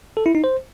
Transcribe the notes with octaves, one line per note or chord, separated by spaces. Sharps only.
A4
E4
D#4
C5